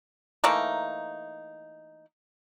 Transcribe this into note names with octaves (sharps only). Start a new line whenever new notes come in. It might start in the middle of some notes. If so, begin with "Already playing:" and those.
E3 A3 A#3 D#4